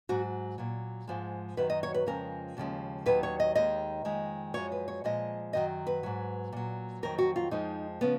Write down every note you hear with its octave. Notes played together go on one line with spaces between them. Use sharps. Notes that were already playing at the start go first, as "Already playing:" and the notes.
G#2 F#3 F#4
A#2 F#3
G#2 F3 G#3
F#2 D#3 F#3 B4
D#5
C#5
B4
F2 C#3 F3 G#3 A#4
D#2 C#3 F3 G#3
D#2 D#3 F#3 B4
C#5
D#5
D#2 D#3 G#3 D#5
F2 D#3 G#3
F#2 F3 G#3 C#5
B4
C#5
A#2 F3 G#3 D#5
F#2 D#3 F#3 D#5
B4
G#2 F#3
A#2 F#3
F2 D#3 F#3 A#4
F#4
F4
F2 F3 G#3 D#4
C#3 F3 G#3 B3